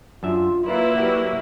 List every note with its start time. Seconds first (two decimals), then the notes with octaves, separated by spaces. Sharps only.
0.23 F#2 D4 F4 E5
0.66 F#3 A#3 E4 F4 A#4 B4 D5
0.97 F#4 G4 B4 D5